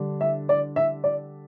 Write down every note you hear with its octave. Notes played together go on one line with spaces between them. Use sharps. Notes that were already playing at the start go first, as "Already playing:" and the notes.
Already playing: D3 G3 D4
E5
D5
E5
D5